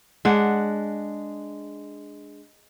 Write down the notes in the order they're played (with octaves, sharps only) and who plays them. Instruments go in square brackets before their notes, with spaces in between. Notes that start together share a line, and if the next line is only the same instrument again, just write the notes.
[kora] G#3 D4 F#5